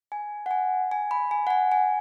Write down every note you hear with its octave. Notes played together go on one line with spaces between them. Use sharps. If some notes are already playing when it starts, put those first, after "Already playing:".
G#5
F#5
G#5
G#5
B5
G#5
F#5
G#5
G#5